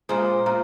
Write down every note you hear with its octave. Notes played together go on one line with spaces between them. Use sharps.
A#2 G#3 C5
A#2